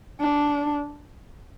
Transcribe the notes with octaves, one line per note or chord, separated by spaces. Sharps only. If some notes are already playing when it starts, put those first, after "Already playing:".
D4